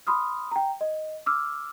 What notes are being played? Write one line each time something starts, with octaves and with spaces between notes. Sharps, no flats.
B5 C6 D#6 F6
G5 A#5
D#5
D6 E6 F6